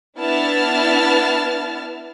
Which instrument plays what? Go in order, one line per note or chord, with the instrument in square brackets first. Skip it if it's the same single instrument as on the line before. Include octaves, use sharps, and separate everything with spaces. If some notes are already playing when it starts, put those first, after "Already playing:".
[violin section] B3 D4 E4 A5 F6 A6